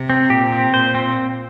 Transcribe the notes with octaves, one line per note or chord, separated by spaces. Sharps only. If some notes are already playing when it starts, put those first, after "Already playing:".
Already playing: C3
C4
A#2 G4
C4
A#2 C5
C4